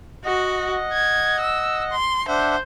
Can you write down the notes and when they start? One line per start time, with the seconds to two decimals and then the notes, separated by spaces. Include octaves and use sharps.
0.25 F#4 D#5 F#5
0.92 G#6
1.41 E6
1.92 C6
2.28 D4 C5 E5 F#5